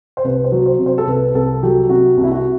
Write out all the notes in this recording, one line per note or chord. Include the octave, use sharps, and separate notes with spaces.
C5
C2 B4
C5
F#3
C5
C3
C5
A4
C2 B4
C2 A4
F#3 G4
C3 F#4
C2
E4
F#4